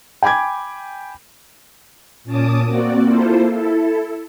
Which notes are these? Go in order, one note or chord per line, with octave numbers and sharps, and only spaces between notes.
G5 G#5 B5 D6 G#6
A#2 C#4 A5 D6 D#6
A#3 C4 F#4 D5
A#3 E4 F4 A4 C5
E4 A4